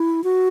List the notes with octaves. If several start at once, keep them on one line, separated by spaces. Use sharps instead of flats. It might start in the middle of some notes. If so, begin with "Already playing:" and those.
Already playing: E4
F#4